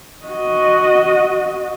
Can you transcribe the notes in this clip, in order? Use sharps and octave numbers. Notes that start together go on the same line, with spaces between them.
F#4 D#5